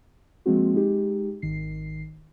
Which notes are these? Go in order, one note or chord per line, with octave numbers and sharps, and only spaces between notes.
F3 G#3 A#3 C4 F#4
G#3 D#4 G4
G#1 D#3 C7